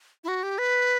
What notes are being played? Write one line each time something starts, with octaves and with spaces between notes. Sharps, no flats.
E4
F#4
G4
B4